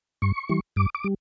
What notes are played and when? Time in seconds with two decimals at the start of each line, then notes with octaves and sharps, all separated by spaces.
0.22 G2 C#6
0.49 E3 G3
0.76 G2 D6
0.95 D6
1.04 G3